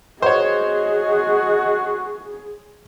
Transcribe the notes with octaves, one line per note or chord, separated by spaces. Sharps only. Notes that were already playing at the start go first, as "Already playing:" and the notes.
F#4 G#4 C5 C#5 D#5